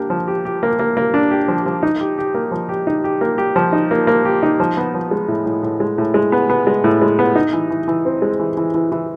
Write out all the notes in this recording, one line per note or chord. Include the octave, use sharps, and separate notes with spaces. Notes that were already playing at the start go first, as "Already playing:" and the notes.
Already playing: A#3 D4 G4
F3
G4
G4
A#3
A#3
A#3
D4
G4
F3
F3
D#4
G4
G4
A#3
F3
G4
D#4
G4
A#3
G4
F3
D#4
A#3
A#3
G4
D#4
F3
B3
F3
G#3
A2
A2
A2
G#3
A2
G#3
B3
B3
G#3
A2
G#3
B3
D#4
E3
E3
E3
C4
G#3
E3
E3
E3
E3